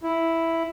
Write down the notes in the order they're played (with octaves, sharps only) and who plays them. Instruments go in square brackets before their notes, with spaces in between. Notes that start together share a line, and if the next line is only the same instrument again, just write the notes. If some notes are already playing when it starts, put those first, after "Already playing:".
[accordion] E4